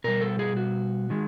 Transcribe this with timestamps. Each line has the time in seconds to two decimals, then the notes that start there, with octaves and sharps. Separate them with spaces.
0.04 B2 G3 A#4
0.21 A4
0.39 G#4
0.56 F#4
1.10 D#3 G#3